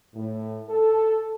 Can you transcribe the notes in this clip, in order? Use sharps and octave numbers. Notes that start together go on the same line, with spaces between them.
A2
A4